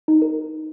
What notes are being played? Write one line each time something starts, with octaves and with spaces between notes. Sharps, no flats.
D#4
A#4